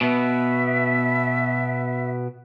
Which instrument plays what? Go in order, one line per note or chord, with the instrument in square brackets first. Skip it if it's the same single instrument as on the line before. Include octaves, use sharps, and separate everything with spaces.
[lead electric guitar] B2 B3 [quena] E5